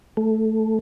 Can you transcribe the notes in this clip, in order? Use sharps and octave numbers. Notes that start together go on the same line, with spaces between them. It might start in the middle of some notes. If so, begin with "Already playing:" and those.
A3